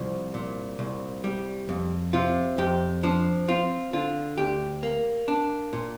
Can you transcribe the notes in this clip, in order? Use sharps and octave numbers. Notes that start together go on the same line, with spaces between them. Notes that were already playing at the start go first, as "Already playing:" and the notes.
Already playing: C2 F3
A#2
C2
G3
F2
C3 F4
F2 G4
F3 D4
C4 F4
D3 F4
D2 G4
A#3
D4
A#2